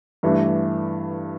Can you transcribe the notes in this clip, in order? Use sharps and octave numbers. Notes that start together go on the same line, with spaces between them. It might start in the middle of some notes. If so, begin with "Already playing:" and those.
G2 E3 A3 D4